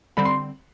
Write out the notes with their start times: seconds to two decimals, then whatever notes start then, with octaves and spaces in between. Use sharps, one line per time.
0.17 D3 G3 C4 B5
0.25 C6